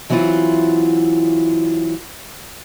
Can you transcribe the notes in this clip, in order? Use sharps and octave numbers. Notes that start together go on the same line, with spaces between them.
E3 F#3 C4 E4 F4